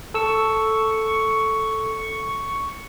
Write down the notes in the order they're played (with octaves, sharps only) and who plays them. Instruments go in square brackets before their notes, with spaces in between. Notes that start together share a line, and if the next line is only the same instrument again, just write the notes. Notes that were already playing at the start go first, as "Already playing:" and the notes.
[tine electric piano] A4 E6 [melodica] C#6